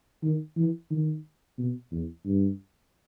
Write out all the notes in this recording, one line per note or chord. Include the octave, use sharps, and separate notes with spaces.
D#3
E3
D#3
B2
E2
G2